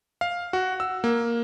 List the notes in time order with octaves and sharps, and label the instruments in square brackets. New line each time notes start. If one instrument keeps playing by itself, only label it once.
[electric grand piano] F5
F#4
E6
A#3